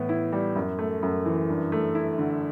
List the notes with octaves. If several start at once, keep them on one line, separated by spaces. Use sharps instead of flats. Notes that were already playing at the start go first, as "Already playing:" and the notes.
Already playing: A2 E3 B3
E4
G3
F#2
A3
F#2
E3
G2
A3
E4
D3